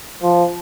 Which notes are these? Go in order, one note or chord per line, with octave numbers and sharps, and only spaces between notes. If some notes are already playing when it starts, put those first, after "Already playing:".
F3